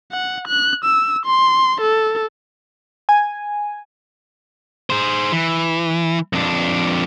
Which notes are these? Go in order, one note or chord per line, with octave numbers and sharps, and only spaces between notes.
F#5
F#6
E6
C6
A4
G#5
G#4 C5
E3
F2 D4